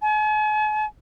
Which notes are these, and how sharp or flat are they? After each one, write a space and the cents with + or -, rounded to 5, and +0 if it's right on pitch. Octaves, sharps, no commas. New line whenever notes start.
G#5 +45